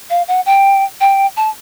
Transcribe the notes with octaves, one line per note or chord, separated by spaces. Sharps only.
F5
F#5
G5
G5
A5